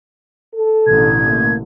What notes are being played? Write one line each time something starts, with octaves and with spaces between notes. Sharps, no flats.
A4
A1 B2 D3 G#6
A3 A#3